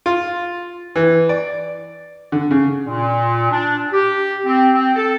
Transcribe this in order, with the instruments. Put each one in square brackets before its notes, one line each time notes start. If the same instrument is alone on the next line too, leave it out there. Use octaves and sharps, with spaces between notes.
[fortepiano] F4
E3
D5
D3
C#3
[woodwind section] A#2
D4
G4
C4
C4
A4